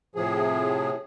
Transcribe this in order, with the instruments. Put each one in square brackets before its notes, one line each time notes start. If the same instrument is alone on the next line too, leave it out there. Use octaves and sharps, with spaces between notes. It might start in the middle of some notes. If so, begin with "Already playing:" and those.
[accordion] A2 C3 F3 G#4